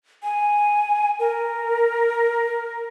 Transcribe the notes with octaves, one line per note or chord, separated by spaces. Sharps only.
G#5
A#4